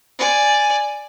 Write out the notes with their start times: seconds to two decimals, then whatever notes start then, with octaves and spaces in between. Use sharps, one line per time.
0.19 D5 G#5